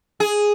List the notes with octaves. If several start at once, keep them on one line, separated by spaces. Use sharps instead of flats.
G#4